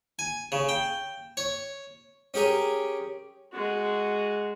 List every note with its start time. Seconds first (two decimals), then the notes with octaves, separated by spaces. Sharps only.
0.19 G#5
0.52 C#3
0.69 G5
1.37 C#5
2.34 C#4 G4 G#4 A#4
3.52 G#3 F#4